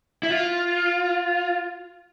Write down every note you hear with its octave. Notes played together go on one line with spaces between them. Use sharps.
E4
F4